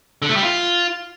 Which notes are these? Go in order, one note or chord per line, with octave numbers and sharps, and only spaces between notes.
D3
A3
G3
F4